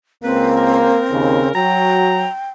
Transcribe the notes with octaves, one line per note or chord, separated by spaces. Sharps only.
C#2 A#3 C4 B4
A#4
D#2 C#3
F#3 F#4 G5 A#5